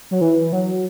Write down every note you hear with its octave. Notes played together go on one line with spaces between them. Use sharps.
F#3
E3
F#3